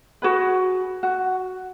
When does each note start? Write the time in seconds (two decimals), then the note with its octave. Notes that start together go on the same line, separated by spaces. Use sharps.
0.22 F#4 G#4 B4
1.03 F#4